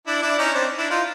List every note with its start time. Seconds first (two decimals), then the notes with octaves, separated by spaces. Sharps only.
0.07 D4 E4
0.22 D4 E4
0.39 C#4 D#4
0.54 C4 D4
0.78 D4 E4
0.90 D#4 F4